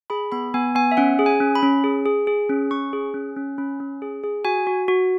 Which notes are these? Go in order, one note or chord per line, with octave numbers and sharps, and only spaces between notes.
G#4 B5
B3 B5
B3 G#5
B3 G#5
E5
C#4 F#5
G#4
G#5
C#4
B5
C#4
G#4
G#4
G#4
C#4
C#4 C#6
G#4
C#4
C#4
C#4 B5
C#4
G#4
G#4
F#4 G#5
F#4
F#4